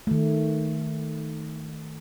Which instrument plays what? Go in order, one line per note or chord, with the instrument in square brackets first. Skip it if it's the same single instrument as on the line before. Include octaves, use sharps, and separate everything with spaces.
[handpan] D#3 A3